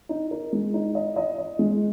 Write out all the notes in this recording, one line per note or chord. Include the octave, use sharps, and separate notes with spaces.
D#4
A#4
G#3
D#4
D#5
D#5
D#5
G#3